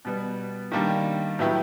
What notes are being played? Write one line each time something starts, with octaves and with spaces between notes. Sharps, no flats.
B2 G3 B3
D#3 G3 A#3 D4 G4
A2 F#3 B3 E4 G4